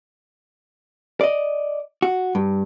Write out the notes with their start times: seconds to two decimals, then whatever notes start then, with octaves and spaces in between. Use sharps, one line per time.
1.21 D5 D#5
2.02 F#4
2.35 G2